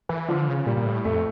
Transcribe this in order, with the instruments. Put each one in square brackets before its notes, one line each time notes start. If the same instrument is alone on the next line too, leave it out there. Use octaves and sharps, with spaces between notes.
[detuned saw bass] E3
[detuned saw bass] D3 [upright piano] F3
[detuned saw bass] C#3
[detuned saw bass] A#2 [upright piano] G3
[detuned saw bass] A#2
A2
[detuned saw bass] F2 [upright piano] A3